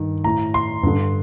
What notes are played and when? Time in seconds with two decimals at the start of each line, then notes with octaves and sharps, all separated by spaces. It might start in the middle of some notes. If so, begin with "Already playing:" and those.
Already playing: G2 D#3
0.24 A2 A#5
0.54 C6
0.83 G2 D3